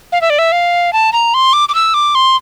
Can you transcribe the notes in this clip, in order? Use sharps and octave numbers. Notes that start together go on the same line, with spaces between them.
F5
E5
D5
E5
F5
A5
A#5
C6
D6
D6
E6
D6
C6